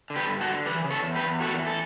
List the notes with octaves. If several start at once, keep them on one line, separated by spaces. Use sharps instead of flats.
D3
G4 B4
G2
F#4 A4
D3
E3 G4 B4
C#3
A4 C#5
E2
G4 B4
E2
A2 F#4 A4
E3
A4